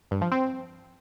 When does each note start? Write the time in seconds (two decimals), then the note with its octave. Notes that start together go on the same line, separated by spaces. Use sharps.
0.11 G2
0.21 F3
0.32 C4